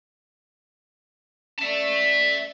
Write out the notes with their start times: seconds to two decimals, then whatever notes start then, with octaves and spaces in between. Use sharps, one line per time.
1.59 C#4 D5 E5 A5